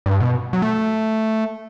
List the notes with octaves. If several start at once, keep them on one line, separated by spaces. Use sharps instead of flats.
G2
B2
F#3
A3